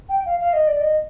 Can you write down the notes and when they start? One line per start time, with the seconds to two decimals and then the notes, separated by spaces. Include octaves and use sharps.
0.09 G5
0.26 F5
0.40 F5
0.53 D#5
0.67 D5
0.81 D#5